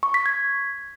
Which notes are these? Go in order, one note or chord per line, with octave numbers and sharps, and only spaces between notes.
C#6
B6
G#6